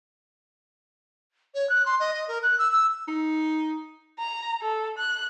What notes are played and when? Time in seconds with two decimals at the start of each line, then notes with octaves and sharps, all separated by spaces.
1.55 C#5
1.70 F#6
1.86 C6
2.00 D#5
2.14 D#5
2.28 A#4
2.43 F#6
2.59 E6
2.72 E6
3.08 D#4
4.19 A#5
4.62 A4
4.98 F#6